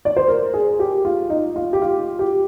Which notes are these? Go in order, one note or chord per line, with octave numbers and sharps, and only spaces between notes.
D5
C5
A#4
G#4
G4
F4
D#4
F4
G4
F4
G4